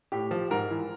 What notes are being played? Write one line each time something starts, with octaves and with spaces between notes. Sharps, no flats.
A2 G4
F3
G#2 A#4
E3